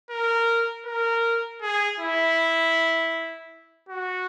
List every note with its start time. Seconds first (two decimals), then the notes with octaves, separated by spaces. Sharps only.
0.10 A#4
0.86 A#4
1.61 G#4
1.99 E4
3.89 F#4